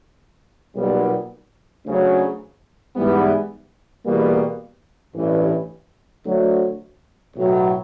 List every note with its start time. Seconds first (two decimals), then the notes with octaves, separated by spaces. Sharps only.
0.75 B1 A#2 G3 B3
1.85 D2 C#3 F#3
2.95 G#2 E3 G3 B3
4.05 E2 B2 G3 A#3
5.15 A1 G2 E3
6.24 D2 D3 F#3
7.35 B1 A2 F#3